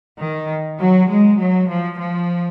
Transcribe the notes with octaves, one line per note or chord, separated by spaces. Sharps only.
D#3
F#3
G#3
F#3
F3
F3